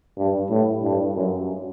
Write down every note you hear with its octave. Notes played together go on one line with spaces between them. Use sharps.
G2
A2
G2
F#2